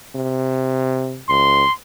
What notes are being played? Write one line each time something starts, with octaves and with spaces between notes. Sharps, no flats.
C3
C#2 C6